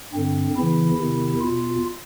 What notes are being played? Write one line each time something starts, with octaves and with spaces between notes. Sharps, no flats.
G2 D3 C4
E2 C#3 E3 E4
E2 C3 D#3 E4
E2 B2 F4